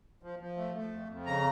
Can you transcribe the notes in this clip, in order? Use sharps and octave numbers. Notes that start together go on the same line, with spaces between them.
F3
F3
A3
A3
F2
F2
C#3 A#5